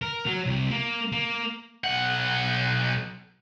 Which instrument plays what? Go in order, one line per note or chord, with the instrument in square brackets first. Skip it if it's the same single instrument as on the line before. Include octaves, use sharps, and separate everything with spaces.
[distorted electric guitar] A#4
F#3
C2
A#3
A#3
B1 F#5